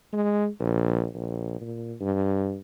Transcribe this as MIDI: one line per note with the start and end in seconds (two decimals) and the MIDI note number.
0.13 0.47 56
0.60 1.06 34
1.15 1.60 34
1.61 1.95 46
2.00 2.59 43